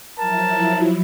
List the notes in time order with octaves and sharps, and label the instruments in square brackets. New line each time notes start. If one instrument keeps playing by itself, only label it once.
[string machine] F3 F#3 E4 [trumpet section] A#4 A5